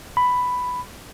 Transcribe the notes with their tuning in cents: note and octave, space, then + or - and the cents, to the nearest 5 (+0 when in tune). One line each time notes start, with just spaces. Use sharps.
B5 +5